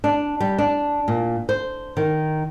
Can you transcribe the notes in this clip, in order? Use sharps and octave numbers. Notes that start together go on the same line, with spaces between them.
D4
G3
D4
A#2
C5
D#3